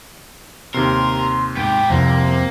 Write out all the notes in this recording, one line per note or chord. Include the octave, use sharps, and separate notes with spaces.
D#2 C3 A#4 C6
G#2 B3 G4 G5
C2 F2 C3 A#3